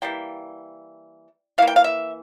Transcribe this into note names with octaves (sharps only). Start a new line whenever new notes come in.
E3 G3 A#3 G5
E3 A#3 F5
G5
F5
E5